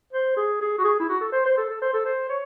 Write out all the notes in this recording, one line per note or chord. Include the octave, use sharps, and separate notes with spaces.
C5
G#4
G#4
F#4
G#4
E4
F#4
A4
C5
C5
A4
A4
C5
A4
C5
C#5